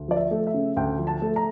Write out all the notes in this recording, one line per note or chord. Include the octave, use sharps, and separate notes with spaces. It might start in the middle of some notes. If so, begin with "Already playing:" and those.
Already playing: D2
F3 D5
E5
A3
E5
C#3
D2 G5
F3
A5
A3
A#5